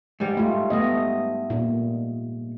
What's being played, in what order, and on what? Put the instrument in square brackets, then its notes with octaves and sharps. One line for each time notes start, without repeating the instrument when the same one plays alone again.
[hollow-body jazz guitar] G#2 G3
[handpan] A3 F4
A3 B3 D#5
A#2